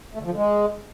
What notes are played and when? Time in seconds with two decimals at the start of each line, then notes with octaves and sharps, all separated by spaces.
0.15 A3
0.20 D3
0.25 F3
0.30 D3
0.35 G#3